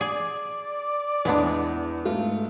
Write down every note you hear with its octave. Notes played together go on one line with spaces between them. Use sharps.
G#4 D5
E2 E3 G#3 B3 D4
G#2 A3 F4